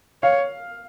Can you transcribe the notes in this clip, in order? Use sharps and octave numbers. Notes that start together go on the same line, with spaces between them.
C#5 F5